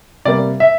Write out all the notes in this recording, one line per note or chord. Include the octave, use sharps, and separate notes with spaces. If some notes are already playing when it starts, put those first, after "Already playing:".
C3 G3 A#3 D5
E5